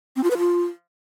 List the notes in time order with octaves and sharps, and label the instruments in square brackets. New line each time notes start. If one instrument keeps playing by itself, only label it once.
[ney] C4
F4
B4
F4